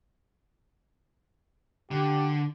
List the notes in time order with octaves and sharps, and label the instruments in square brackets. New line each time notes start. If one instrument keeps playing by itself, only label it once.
[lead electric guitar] D3 [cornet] G4